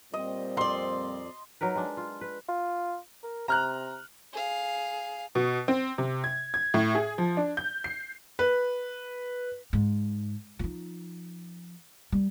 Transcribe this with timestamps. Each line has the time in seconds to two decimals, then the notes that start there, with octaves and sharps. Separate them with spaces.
0.14 A#2 G3 C4 D#5
0.57 F2 D5 C6
1.61 F#3 D#4 A#4 B4
1.76 G#3 D4
1.97 F4
2.21 B4
2.49 F4
3.24 A#4
3.48 C3 A#5 F6 F#6
4.33 G#4 F5
5.35 B2
5.68 C4
5.98 C3
6.24 G#6
6.54 G#6
6.74 A2
6.95 G#4
7.18 F3
7.37 D4
7.57 G6
7.84 C7
8.39 B4
9.73 G#2
10.59 F3 D#4
12.12 G3